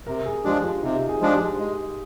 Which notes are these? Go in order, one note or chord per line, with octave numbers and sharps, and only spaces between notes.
C3 A#4
G#4
F3 G#3 D4 G4
F4
C3 D#4
G#4
F3 G#3 D4
G4
G#3